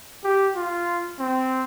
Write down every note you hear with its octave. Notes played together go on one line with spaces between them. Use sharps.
G4
F4
C4